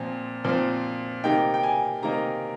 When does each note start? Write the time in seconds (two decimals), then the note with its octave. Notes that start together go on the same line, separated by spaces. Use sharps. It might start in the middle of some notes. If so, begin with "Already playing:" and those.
Already playing: A#2 F3 C4
0.44 A#2 F3 C4
1.24 C3 D#3 A#3 D#4 G5
1.54 G5
1.63 G#5
2.03 C3 D#3 A#3 D#4 A#5